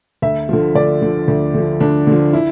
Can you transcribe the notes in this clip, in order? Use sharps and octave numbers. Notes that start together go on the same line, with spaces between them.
D2 E5
D3 F3
D2 D5
D3 F3
D2
D3 F3
D2 D4
D3 F3
E4